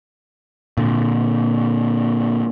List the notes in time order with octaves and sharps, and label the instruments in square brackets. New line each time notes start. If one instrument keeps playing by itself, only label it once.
[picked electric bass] A#2 D3